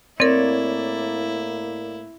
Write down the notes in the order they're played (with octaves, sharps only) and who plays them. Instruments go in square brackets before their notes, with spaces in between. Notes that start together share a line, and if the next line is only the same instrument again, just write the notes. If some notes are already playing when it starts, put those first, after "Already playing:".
[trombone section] A2 A#3 [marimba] C4 A#4 [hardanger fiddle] E4 [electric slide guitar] C#5 D5